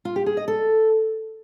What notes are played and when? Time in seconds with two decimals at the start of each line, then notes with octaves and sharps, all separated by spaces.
0.05 F4
0.16 G4
0.26 G#4
0.37 D#5
0.48 A4